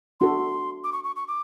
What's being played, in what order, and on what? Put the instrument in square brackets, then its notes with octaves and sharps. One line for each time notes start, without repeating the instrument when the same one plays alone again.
[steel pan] D4 F#4 A4 [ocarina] C6
[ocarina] D6
C#6
C#6
C#6
D6